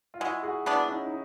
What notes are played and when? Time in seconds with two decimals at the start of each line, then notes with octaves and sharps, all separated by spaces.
0.14 F4
0.20 G#3 E4 F#4
0.43 F#4 G#4
0.66 B3 D4 E4 F#4
0.88 C#4 D#4
1.06 D#4